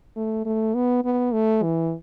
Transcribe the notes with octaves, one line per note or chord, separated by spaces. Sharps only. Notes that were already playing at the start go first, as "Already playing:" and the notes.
A3
A3
B3
B3
A3
E3